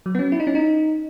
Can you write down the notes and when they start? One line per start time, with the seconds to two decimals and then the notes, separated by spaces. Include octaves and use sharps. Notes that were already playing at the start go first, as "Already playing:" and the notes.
0.06 F#3
0.15 B3
0.19 C#4
0.32 E4
0.40 D#4
0.47 C#4
0.55 D#4